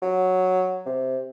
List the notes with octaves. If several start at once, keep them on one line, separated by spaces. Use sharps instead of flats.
F#3
C3